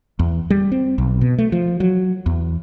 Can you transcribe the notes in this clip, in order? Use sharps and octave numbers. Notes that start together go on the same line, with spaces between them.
E2
G3
C4
B1
B2
A3
F3
F#3
E2